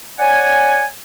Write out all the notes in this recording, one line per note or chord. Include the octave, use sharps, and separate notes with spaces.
C#5 D5 F#5 G#5